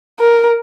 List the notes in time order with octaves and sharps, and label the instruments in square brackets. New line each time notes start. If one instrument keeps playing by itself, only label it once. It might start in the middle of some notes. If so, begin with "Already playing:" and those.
[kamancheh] A#4